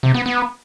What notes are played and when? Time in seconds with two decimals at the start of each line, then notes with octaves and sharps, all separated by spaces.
0.03 C3
0.14 B3
0.26 B3